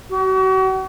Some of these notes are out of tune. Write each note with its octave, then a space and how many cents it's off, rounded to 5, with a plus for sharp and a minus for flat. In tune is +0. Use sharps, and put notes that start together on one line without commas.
F#4 +40